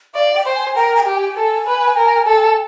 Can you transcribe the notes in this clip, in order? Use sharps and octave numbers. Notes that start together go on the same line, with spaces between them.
D5 F5
G5
C5
G#5
A#4 G5
G#5
G5
G4
G#5
A4
B4
A#4
A4